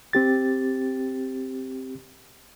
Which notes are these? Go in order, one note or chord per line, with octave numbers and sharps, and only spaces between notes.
C4 G4 A6